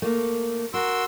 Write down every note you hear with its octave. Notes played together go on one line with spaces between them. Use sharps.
A3 A#3
F#4 A#4 C6 E6